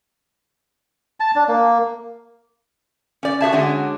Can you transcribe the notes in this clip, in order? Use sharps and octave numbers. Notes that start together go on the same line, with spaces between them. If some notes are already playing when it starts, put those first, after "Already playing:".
A5
D4
A#3
C#4 D5
F#4 G#4 E5 A5
D3 G#3 C#4 D4 F#4